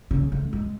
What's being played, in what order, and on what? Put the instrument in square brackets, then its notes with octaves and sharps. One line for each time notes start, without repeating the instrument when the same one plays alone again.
[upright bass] C#3
A3
G#3